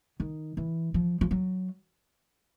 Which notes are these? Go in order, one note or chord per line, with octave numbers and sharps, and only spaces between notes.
D#3
E3
F3
F3
F#3